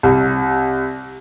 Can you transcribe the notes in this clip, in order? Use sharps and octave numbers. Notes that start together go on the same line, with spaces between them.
C2